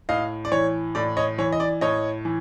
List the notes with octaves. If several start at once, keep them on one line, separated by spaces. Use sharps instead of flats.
A2 D#5 F5
D5
E3 C#5
A2 D5
C#5 D#5
E3 C#5
D#5
D5
A2 C#5 D#5
E3